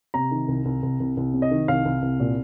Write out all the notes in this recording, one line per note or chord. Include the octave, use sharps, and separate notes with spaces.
C3 A#5
D#3
C2
C2
C2
C2
C2
C3
D#5
D#3
C2 F5
C2
C2
A#2